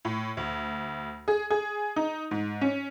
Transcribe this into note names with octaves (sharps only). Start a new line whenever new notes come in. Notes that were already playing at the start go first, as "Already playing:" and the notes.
A2
D2
G#4
G#4
D#4
G#2
C#4